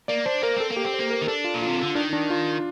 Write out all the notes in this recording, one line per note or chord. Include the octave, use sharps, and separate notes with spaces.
A#3 D5
D4 C5
A#3 A#4
C4 A4
A#3
G4
C4
C5
A#3
A#4
D#4
D4 A4
F4
A#2
F4
C3
D3
D#3 D4
D4
F4